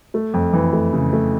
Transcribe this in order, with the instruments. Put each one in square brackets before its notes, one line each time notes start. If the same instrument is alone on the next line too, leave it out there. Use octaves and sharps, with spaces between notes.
[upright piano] A3
F2
E3
A3
C#3
A3